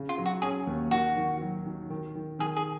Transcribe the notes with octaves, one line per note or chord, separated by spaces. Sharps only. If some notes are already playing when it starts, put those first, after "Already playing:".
Already playing: C#3
F4
F#3
F#4
C#4 G#4
D#2
D#3 F#4
D#3
F#3
D#3
D#3
D#3
D#3 G#4
G#4